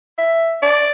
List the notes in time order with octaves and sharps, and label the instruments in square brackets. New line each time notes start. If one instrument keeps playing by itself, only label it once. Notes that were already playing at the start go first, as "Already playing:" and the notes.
[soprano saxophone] E5
D5